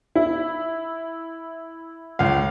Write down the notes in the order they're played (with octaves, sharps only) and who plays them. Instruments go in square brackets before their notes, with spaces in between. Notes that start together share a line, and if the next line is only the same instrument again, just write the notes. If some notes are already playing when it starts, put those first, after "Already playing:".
[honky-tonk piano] E4
[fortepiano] C#2 F4 F5